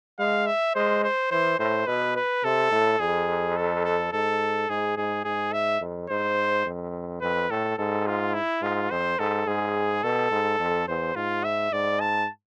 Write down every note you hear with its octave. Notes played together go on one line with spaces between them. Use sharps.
G#3 F5
E5
G#3 C5
C5
E3 C5
A2 C5
B2 B4
B4
C3 A4
A2
F2 G#4
A4
A4
G#2 A4
G#2 G#4
G#2 G#4
G#2 G#4
E5
F2
G#2 C5
F2
F2 B4
A2 A4
G#2 A4
F4
E4
G#2 F4
F2 C5
G#2 A4
G#2 G#4
B2 A4
G#2
F2
E2 C5
G#2 F4
E5
G#2 D5
A5